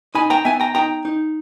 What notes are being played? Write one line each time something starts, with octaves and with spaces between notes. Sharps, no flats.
D#4 G#5 B5
G5 A#5
B3 E5 G#5
G5 A#5
D#4 G5 A#5
D#4